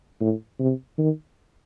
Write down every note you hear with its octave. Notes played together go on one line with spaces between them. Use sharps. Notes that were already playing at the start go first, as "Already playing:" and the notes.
A2
C3
D#3